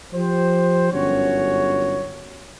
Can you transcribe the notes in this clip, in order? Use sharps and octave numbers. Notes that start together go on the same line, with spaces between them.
F3 G4 C5
G1 F#2 C#4 F#4 C#5